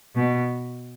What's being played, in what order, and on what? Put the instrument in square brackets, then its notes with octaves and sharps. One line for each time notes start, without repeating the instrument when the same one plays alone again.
[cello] B2